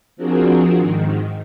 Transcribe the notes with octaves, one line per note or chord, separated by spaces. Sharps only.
F3 C4 D4 F#4 G#4 A#4
G#2 D#3